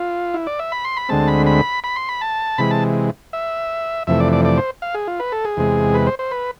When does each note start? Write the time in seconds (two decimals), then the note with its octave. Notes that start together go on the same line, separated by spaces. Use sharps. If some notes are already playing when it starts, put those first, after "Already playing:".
Already playing: F4
0.34 E4
0.47 D5
0.59 E5
0.72 B5
0.85 C6
0.97 B5
1.09 D2 D3 G#3 C4 A5
1.28 B5
1.46 B5
1.84 B5
1.96 C6
2.09 B5
2.21 A5
2.58 C3 E3 G#3 B5
2.71 A5
3.33 E5
4.07 F2 C3 E3 A3 E5
4.20 D5
4.33 D5
4.45 D5
4.57 C5
4.82 F5
4.94 G#4
5.07 F4
5.20 B4
5.32 A4
5.45 G#4
5.57 E2 C3 G#3
5.94 B4
6.07 C5
6.19 C5
6.31 B4